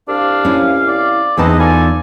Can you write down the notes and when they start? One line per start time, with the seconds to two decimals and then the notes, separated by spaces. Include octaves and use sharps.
0.08 C2 D4 F5
0.45 C#4 E4
0.88 D5
1.37 E2 C4 D#4 G#4 B4 D#5 A5
1.60 F4 A4 D5 G#5